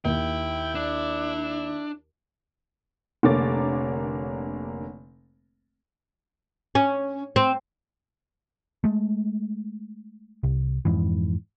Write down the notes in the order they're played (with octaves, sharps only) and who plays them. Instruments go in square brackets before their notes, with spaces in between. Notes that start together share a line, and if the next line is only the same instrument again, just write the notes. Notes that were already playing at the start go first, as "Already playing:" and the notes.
[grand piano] D#2 [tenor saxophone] E4 [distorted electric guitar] G5
[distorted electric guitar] D4
[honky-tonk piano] F1 D3 A#3 C#5 D6 A6
[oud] C#4
C4
[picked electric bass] G#3 A3
C2
F2 G#2 E3